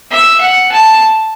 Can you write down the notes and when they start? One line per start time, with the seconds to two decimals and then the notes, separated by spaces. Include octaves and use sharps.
0.11 E5
0.41 F#5
0.72 A5